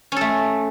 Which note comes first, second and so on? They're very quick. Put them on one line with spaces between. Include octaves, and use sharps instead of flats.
C#4 A4 A3